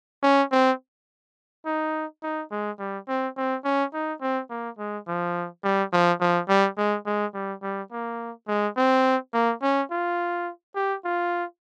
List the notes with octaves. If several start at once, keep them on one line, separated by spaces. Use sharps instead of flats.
C#4
C4
D#4
D#4
G#3
G3
C4
C4
C#4
D#4
C4
A#3
G#3
F3
G3
F3
F3
G3
G#3
G#3
G3
G3
A#3
G#3
C4
A#3
C#4
F4
G4
F4